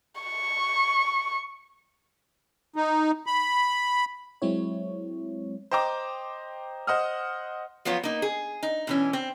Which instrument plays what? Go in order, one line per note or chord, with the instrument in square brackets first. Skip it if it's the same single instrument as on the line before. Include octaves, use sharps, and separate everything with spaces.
[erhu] C#6
[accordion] D#4
B5
[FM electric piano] F#3 G#3 C4 E4 C#5
[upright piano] C5 D#5 G5 A#5 D6
C5 D#5 F#5 D#6 F6
[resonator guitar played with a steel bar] F3 F#3 B3 F4 C#5
A#3 D#4
G#4
D#4
B2 E3 C#4
C4